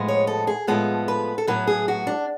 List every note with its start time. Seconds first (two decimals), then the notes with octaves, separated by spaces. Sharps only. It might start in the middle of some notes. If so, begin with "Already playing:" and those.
Already playing: A2 F3 G#3 B3
0.08 C#5
0.27 A4
0.47 G#4
0.67 A2 F3 G#3 B3 A4
1.08 B4
1.38 A4
1.47 A2 F#3 B3 B4
1.67 G#4
1.88 F#4
2.07 D4